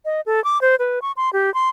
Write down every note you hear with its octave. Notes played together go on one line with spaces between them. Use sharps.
D#5
A4
D6
C5
B4
C#6
C6
G4
C6